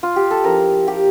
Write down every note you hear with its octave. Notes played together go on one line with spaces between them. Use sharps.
F4
G4
A4
F3 C#4 E4 A#4
G4